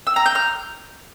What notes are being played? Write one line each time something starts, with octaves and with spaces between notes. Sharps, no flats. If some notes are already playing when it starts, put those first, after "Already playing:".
E6
A#5
G6
F6